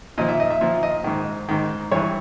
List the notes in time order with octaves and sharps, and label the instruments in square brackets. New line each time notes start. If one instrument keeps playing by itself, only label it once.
[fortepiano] A#2 F3 D#5
E5
D#5
E5
A#2 F3 E5
D#5
G#2 D#3
G#2 D#3
G2 E3 C#5